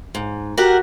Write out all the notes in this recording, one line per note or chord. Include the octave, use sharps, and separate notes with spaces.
G#2
F#4 G4 A#4 F#5